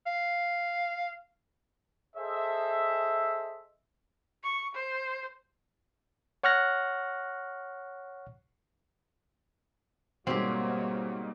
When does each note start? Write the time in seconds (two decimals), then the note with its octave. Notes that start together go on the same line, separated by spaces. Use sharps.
0.06 F5
2.16 G#4 A4 C5 D#5 E5
4.44 C#6
4.75 C5
6.44 C#5 F#5 C#6 F6 F#6 A#6
10.27 G#2 B2 G3 A#3 C4 F#4 G4 C#5